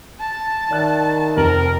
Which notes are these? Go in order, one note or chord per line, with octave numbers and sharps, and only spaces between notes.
A5
D#3 D5 E5 F#6
F1 F2 A#4 F#7